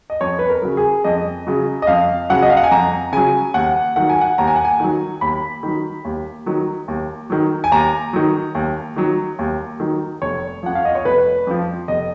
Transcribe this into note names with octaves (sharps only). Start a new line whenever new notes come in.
D#5
F2 C#5
B4
A#4
C#3 F#3
G#4
F2 D#5
C#3 F#3
D#5
F2 F5
C#3 F#3 F#5
D#5
F5
F#5
G#5
F2 A#5
C#3 F#3 G#5
D#2 F#5
D#3 F#3 F#5
G#5
F#5
D#2 A#5
G#5
F#5
G#5
D#3 F#3
D#2 B5
D#3 F#3
D#2
D#3 F#3
D#2
D#3 F#3
G#5
D#2 A#5
D#3 F#3
D#2
D#3 F#3
D#2
D#3 F#3
F1 C#5
F2 F3 F#5
F5
D#5
C#5
F1 B4
F2 F3
F1 D#5